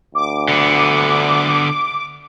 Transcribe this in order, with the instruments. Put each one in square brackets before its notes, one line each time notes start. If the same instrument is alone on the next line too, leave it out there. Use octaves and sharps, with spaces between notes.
[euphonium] D2 [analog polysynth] D6
[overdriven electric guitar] D3 B3